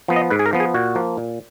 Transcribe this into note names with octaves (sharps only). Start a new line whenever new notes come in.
F3 B3
D#5
G#2 B4
G#4
A#4
F3 B3
G#4
A#2 F#4
F3 A#3
A#2